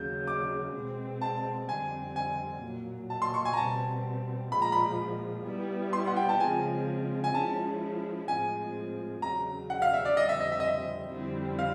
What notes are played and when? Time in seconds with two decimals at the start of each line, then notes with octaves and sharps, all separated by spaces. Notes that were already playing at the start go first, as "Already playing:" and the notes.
Already playing: D#2 C#3 F#3 G6
0.27 D6
0.75 B2 G#3 C4
1.21 A5
1.69 F2 D3 G3 C4 G#5
2.16 G#5
2.63 A#2 F#3 A#3
3.10 A5
3.22 C6
3.34 C#6
3.45 G#5
3.53 A#5
3.57 B2 G3 C4 A5
4.52 A#2 F3 G#3 B5
4.62 A#5
4.72 B5
5.46 G3 B3 E4
5.93 C6
6.07 F#5
6.16 G5
6.29 A5
6.40 C#3 F3 G#3 C4 G#5
7.24 G#5
7.34 F3 G#3 C#4 E4 A5
8.28 A2 F3 G#3 C4 G#5
9.22 E2 C#3 F#3 A#5
9.70 F#5
9.82 F5
9.94 E5
10.05 D5
10.17 F2 D3 G3 C4 D#5
10.29 E5
10.40 D#5
10.52 E5
10.60 D#5
10.67 E5
11.11 F2 D3 G3 C4 E4
11.59 F5